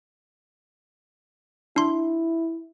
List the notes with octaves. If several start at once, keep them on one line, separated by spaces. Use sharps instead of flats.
D4 E4 C6